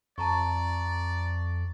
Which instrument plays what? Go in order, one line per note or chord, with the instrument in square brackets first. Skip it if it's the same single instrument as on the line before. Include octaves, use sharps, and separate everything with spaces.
[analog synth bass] F2 [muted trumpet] D5 [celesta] A5 A#5 C#6